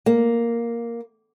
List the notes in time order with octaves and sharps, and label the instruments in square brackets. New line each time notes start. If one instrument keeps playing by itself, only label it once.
[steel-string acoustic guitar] A#3